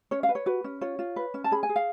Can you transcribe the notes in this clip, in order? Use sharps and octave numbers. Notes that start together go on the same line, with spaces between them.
C#4 C#5
F5
B4
C#5
F#4 B4
C#4
F4 C#5
F4
B4
C#4
A5
G#4 B5
G#5
G#4
F5